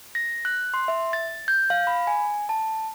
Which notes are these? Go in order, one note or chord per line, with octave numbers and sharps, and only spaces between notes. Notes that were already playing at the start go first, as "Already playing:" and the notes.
A#6
F#6
C6
E5
A6
G6
F5
B5
G#5
A5